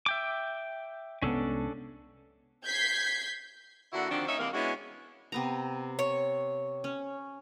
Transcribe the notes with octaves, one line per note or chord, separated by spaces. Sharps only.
E5 G5 D6
C2 G#3 B3 C#4 D4 A4
G6 G#6 B6 C7
D3 A#3 D4 E4 F#4
D3 D#3 F3 C4 D4 F#4
A#3 C#4 D#4 C#5 E5
C3 E3 G#3 A#3
G#3 B3 C#4 D4 E4 F#4
C3 B3 A#5
C#5
C#4